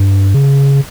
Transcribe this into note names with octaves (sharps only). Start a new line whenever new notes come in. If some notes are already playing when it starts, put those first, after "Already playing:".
Already playing: G2
C#3